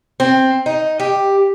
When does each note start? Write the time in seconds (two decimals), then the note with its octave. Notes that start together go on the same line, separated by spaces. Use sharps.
0.20 C4
0.66 D#4
1.00 G4